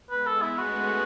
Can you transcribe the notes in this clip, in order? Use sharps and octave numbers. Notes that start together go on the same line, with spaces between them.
G#3 B3 B4
A4
E4
A3 C#4 F#4